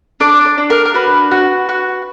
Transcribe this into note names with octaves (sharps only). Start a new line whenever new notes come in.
D4 D5
D5
D4
A#4
A#4
F#4 B4
F#4
F#4